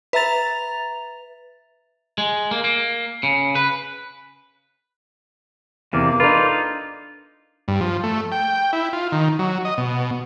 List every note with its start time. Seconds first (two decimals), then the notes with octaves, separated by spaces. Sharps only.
0.13 B4 E5 A#5 A6 F7
2.18 G#3
2.51 A#3
2.64 A#3
3.23 C#3
3.55 B4
5.93 E2 C3 A#3 D5 F5
6.20 D4 D#4 F4 A4 B4
7.68 G2
7.81 F3
8.04 A3
8.32 G5
8.73 E4
8.93 F4
9.12 D#3
9.39 F#3
9.65 D#5
9.78 B2